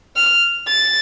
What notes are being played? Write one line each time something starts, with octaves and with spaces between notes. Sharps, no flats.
F6
A6